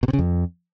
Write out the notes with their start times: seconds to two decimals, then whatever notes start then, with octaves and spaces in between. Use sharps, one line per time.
0.03 B2
0.08 C3
0.13 C#3
0.19 F2